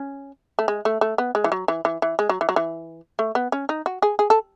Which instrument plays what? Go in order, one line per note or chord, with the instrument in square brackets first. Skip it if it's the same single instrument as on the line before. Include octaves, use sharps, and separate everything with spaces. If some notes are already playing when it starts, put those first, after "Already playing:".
Already playing: [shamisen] C#4
A3
G#3
A3
A3
B3
G#3
E3
F#3
E3
E3
E3
G#3
F#3
E3
F#3
E3
A3
B3
C#4
D#4
F#4
G#4
G#4
A4